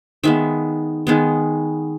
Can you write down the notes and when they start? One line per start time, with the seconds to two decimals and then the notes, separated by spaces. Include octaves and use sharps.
0.24 D#3 G#3 B3 E5
1.07 D#3 G#3 B3